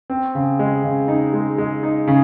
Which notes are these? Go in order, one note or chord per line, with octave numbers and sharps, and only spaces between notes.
C4
C#3
G#3
C#3
D#4
G#3
G#3
D#4
C#3